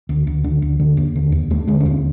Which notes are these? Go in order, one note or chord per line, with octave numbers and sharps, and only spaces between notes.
D2
D2
D3
D2
D3
D#2
D3
D#2
D#2 A3
D3 G#3
C#4
D#2 C4